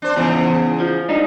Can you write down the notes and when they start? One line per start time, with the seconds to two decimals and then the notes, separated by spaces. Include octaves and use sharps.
0.02 D4 C5
0.16 E2 G#2 C#3 E3
0.80 F3
1.09 G#2 D4 D#4